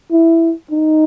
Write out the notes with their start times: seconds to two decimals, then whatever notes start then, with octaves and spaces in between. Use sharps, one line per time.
0.11 E4
0.71 D#4